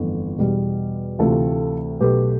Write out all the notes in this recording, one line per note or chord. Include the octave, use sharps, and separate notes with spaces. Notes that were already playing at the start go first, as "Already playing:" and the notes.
Already playing: G1 F2 E3 A3
E2 B2 G3
D2 C3 E3 A3 F4 A4
B1 B2 A3 G4 B4